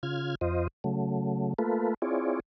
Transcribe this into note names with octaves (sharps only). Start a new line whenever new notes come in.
C#3 F4 F6 G#6
F2 F4 C5 D#5
C#3 F#3 A3
A3 A#3 F4 A4 B4
C4 E4 F4 G#4 C#5 D5